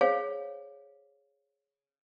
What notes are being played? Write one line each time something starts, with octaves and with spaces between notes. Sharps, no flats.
G#4 C5 C#5 F5